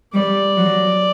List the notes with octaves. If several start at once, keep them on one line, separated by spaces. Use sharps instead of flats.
G3 D5
F#3